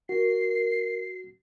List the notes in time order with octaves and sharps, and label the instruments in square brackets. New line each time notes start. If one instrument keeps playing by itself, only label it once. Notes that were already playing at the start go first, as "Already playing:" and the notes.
[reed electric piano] F#4 [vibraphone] A#4 [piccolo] C7